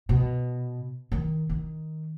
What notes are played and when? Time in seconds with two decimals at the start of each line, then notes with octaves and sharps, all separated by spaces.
0.09 B2
1.12 D#3
1.49 D#3